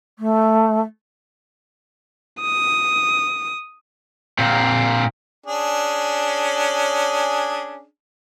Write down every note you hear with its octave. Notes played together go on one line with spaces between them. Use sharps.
A3
D#6
A#2 C4
C#4 D4 G#4